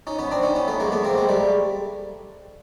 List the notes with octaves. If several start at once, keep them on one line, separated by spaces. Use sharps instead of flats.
C#4 D#4
B3 C#4
C4 D4
C#4 D#4
B3 C#4
A3 B3
G#3 A#3
A3 B3
A#3 C4
G#3
G3 A3